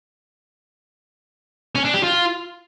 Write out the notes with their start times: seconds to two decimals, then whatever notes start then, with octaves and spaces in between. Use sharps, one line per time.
1.75 C#4
1.85 D4
1.94 G4
2.03 F4